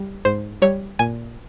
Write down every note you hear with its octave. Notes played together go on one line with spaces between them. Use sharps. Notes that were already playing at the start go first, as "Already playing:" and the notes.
Already playing: G3
G#2 C5
G3 C#5
A#2 G#5